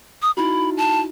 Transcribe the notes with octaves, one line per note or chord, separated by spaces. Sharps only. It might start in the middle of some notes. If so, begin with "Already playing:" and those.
D#6
D#4 E4 F#4 B5
A5